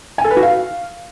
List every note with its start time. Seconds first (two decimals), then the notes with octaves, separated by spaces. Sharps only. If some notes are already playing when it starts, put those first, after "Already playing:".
0.18 G#5
0.24 A4
0.31 B4
0.37 F#4
0.43 F5